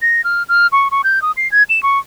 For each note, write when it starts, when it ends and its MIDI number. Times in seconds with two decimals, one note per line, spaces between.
0.02 0.21 94
0.24 0.43 89
0.49 0.67 89
0.72 0.88 85
0.91 1.02 85
1.04 1.22 91
1.22 1.31 87
1.37 1.50 96
1.52 1.63 92
1.69 1.82 100
1.83 1.99 85